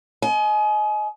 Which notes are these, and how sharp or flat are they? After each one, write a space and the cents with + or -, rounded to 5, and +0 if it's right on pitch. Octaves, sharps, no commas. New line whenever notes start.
D#5 +0 G#5 +35